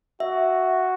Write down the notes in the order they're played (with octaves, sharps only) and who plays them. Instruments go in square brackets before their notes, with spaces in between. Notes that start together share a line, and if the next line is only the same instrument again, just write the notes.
[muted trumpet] F#4 [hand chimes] E5